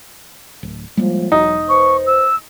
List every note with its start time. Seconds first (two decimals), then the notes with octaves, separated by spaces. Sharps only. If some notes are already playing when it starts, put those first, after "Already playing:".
0.63 D1
0.97 A2 F3 G3 G#3 A#3
1.32 E1 F#3 D#4
1.69 B4 C5 C#6
2.07 E6